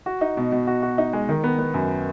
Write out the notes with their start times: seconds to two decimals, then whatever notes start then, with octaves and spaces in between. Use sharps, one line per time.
0.06 F#4
0.21 D#4
0.37 B2
0.52 B2
0.67 F#4
0.83 F#4
0.98 D#4
1.13 G#3
1.29 D#3
1.44 B3
1.59 B3
1.74 F#2